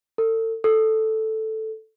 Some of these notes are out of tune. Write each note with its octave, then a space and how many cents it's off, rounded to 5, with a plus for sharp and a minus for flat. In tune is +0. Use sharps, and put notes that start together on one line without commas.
A4 +35
A4 +0